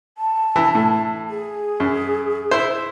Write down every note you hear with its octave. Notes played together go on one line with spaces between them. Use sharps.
A5
E3
A2
G#4
F#2
E4 C5